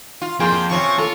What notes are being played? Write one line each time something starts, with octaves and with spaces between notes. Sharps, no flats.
F4
F2 A#3 G#4 G5 C6
C3 F3 C#4 C#6
A#3 F4 A4